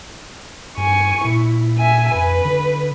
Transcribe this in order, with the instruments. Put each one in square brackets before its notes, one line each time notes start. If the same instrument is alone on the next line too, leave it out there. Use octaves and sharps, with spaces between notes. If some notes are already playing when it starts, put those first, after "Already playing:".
[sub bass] G2 [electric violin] G#5 C#6
[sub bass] A#2 [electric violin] E4
[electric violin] E5 G#5
[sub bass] F2 [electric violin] B4
[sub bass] D3